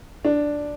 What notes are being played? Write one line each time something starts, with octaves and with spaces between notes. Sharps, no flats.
D4